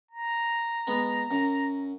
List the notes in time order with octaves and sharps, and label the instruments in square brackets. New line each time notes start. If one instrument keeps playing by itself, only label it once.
[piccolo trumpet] A#5
[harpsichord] G#3 B3
F#2